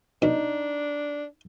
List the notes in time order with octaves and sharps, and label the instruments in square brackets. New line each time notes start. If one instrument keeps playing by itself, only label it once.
[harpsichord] B2 [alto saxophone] D4 [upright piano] D#4